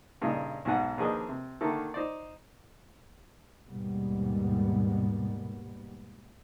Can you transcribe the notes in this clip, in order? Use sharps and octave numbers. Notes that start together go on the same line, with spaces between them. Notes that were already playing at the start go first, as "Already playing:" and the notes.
G2 A#2 C#3 D#4
B1 G#2 B2 F#5 G#5
D#2 F3 D4 G#4 B4 D#5
C3
D3 D#3 A3 A#3 D4 A4
D#4 C5 D5
D#2 G#2 B2 G3 B3